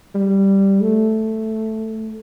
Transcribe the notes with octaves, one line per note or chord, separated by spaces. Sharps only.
G3
A3